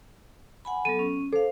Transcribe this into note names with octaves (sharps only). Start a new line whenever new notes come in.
F#5 G#5 B5
F#3 B3 A4 D#7
C#4
A4 C5 F5